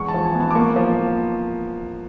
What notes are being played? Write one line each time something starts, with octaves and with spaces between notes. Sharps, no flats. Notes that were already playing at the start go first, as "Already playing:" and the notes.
Already playing: E2 G#3 C#6
A5
F3
G#5
B3
A5
D6
A#3 C#6
F3